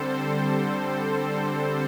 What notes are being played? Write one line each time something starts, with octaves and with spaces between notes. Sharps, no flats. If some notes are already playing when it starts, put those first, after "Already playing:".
Already playing: D3 G3 C4 A4 C5
C5